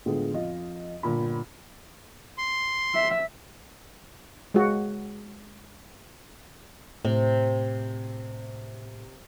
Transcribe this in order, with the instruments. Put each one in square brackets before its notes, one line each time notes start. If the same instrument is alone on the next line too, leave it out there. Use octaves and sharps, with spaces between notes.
[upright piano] A2 D3 G#3 B3 F4
F2 F4 D#5
G1 A#2 F4 B5
[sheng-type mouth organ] C6
[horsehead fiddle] E5
[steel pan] G#3 F#4
[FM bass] A2 [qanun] C3